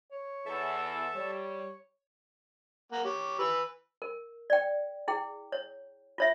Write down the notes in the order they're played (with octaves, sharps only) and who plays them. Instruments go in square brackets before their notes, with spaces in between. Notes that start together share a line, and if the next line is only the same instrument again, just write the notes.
[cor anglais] C#5
[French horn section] E2 [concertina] A4 E5 A5
[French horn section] G3 [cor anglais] C#5
[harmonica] A#3 F#5
G4 C#5
B4 E6
[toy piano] A#4
D5 G5
E4 G#4 G5
C#5
F4 C#5 E5